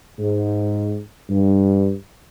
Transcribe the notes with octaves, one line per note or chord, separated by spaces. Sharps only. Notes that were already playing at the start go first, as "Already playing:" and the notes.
G#2
G2